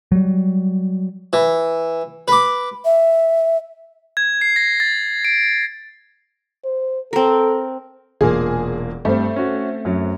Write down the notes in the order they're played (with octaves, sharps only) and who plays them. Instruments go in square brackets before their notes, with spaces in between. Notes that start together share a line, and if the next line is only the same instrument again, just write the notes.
[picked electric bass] F#3 G3
[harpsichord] E3
B4 D6
[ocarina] E5
[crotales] G#6
C7
A#6
A6
D7
[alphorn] C5
[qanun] C4 A#4 [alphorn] A4
[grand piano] E1 A#2 A#3 [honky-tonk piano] G#4
[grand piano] G2 G3 [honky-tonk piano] A3 C4
[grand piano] C#4 F#4
F#2 F#3